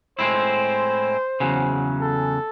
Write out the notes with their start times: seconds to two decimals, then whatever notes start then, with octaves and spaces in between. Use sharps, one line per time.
0.18 A2 G#3 C4 E4 C5
1.40 E2 C#3 F#3
2.01 A4